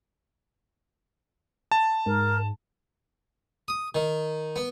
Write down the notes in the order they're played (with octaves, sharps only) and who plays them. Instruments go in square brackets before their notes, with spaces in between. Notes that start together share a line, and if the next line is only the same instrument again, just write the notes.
[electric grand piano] A5
[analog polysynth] G#2 [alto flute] A#4
[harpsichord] D#6
D#3
B3